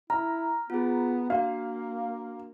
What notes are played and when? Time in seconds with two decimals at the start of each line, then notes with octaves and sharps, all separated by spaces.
0.10 E4 A#5 F6
0.70 B3 F4 G#4
1.30 A#3 D4 F#4 F5